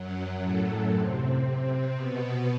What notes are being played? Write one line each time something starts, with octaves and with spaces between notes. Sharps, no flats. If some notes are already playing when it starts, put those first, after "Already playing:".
Already playing: F#2 F#3
A2 A3
C3 C4
B2 B3